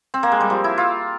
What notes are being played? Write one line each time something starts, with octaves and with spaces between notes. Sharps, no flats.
C4
A#3
G#3
G3
F3
E4
F4